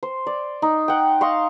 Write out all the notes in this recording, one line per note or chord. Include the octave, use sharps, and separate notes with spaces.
C5
D5
D#4
F#5 G5
D#5 F5 C6 C#6